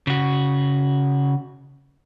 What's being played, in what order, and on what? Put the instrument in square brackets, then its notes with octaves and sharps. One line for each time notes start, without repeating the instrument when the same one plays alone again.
[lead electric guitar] C#3 F#4